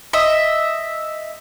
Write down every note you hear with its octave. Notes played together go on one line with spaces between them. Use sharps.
D#5 E5